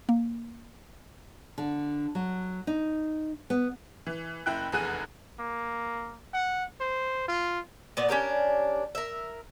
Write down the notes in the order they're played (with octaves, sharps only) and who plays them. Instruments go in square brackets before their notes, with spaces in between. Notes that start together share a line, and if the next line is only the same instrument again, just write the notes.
[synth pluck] A#3
[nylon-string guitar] D3
F#3
D#4
B3
[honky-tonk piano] E3
F#1 E4 G5 F#6
F1 E2 G#4 F#6 D#7
[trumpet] A#3
F#5
C5
F4
[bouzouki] A#2 B3 D5
C#4 D4 G4 A#4
A#4 E5